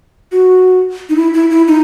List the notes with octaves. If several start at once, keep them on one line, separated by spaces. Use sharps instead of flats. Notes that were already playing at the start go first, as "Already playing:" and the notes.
F#4
D#4
E4
E4
E4
D#4